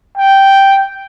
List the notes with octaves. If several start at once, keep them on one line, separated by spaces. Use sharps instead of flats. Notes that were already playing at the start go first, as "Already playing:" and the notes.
G5